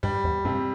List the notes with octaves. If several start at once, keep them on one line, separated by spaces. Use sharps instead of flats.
G2 G3
E2
G2 C3